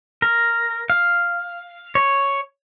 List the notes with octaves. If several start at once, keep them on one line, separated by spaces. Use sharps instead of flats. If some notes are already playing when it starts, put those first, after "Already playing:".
A#4
F5
C#5